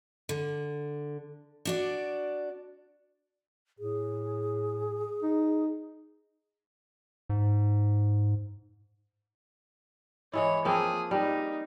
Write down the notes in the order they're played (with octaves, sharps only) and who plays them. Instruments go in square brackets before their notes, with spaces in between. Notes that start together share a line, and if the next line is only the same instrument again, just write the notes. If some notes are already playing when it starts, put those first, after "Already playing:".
[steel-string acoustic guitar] D3
D4 F#4 D5
[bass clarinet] A2 [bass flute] G#4
[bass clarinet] D#4
[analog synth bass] G#2
[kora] E3 G#3 E4 [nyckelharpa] C#5
[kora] F3 A#3 C4 [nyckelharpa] G#4
[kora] G3 [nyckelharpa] D#4